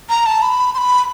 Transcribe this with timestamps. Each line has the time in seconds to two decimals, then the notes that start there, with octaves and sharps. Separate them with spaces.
0.09 A#5
0.26 A5
0.42 B5
0.74 C6
0.78 B5